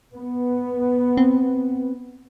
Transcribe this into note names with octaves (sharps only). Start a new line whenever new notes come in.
B3
C4